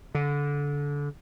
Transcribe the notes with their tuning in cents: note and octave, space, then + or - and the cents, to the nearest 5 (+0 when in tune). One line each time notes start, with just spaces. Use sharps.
D3 -25